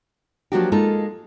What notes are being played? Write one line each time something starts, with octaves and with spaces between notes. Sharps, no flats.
F3 F#3 A#3 D4 F#4 G4
G#3 A#3 D#4 F4 A4